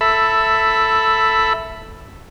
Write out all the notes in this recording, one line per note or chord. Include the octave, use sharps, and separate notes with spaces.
A4 E5 B5